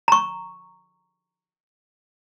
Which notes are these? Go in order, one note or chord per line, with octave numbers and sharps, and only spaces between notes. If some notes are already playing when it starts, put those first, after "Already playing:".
A#5 C#6